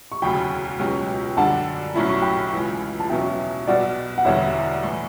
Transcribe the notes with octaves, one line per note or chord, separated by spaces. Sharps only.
C#6
E1 D2 C#3 F#3 G5 B5
C#2 B2 F#3 C#4 G4
F#2 D3 G3 D4 F#5 A5
B1 A2 F#3 C#4 E4 B5
C#6
G5 B5
C#2 C#3 E3
A5
E2 B2 F#3 C#4 E5 G5
B1 B2 G3 D5 F#5
F#5
E1 E2 D3 G3 C#5 E5
A2 E3